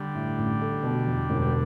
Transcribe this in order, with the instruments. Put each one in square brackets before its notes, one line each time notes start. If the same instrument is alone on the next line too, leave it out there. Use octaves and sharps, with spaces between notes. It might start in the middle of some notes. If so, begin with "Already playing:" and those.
Already playing: [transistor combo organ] D3 G3
[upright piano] A2
A1
A3
B2
E2
E1
[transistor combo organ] G3